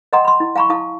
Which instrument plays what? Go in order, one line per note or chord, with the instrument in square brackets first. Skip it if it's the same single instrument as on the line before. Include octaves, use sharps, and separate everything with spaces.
[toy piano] D#5 F#5 G5 A#5 C6 D#6
B5 C6
E4
F5 G#5 A#5 B5 C#6
E4 F5 A5 D#6